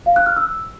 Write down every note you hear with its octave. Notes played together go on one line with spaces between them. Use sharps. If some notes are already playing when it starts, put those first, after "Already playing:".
F5
F#6
F6
E6